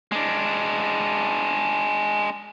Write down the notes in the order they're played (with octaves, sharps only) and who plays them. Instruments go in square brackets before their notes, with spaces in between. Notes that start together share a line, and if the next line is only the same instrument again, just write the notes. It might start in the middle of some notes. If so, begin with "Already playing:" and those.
[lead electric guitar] G#3 D4